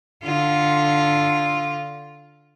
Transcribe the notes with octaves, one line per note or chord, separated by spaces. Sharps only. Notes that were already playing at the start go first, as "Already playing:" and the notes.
D3 F4